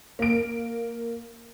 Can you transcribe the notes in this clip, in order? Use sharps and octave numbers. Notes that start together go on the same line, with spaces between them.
A#3 D7